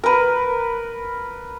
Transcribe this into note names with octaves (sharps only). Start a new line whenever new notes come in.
A#4 B4